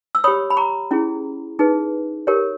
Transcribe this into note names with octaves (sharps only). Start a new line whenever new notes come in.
E6
G4 C#5 B5 D#6
B5
A#5 C#6
C#4 E4 G#4
D#4 G#4 B4
G4 A#4 C#5